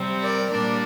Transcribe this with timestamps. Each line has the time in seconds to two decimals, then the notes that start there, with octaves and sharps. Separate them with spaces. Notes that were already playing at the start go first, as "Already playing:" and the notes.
Already playing: C3 G3 C4
0.22 A#4 D5
0.50 A#2 G3 D4 A#4 D5